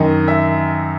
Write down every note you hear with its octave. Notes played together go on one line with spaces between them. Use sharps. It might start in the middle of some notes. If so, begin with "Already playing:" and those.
Already playing: F#2 D#3 D#5
E5